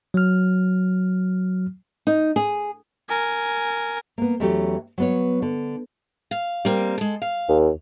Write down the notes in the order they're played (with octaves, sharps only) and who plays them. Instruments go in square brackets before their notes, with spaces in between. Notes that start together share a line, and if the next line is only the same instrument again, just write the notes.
[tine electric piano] F#3 F6
[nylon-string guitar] D#4
G#4
[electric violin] A#4 G#5
[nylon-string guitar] A#3 B3
E2 E3 F#3 A3 C#4 G4
F#3 B3 C#5
D3
[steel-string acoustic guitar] F5
G3 A#3 C4
G#3 A4
F5
[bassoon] D#2